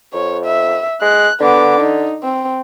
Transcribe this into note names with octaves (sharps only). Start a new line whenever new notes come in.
F2 C#5
E5
G#3 F#6
D3 B3 D6
D#4
C4